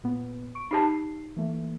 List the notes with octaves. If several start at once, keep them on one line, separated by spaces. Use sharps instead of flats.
A#2 B3
C#6 D7
D#4 G4 A5 C7
E3 A3 A#3